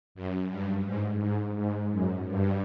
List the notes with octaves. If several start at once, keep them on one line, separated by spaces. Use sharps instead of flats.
F#2
G2
G#2
G#2
G#2
F#2
G2